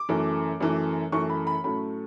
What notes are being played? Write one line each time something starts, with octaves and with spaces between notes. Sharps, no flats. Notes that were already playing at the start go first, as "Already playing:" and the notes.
Already playing: D6
F#2 E3 A3
F#2 E3 A3
F#2 E3 A3 C#6
B5
B5
A2 F#3 A3 C#4 B5